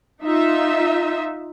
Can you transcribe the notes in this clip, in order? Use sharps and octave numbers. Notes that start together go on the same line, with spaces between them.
D#4 F4 E5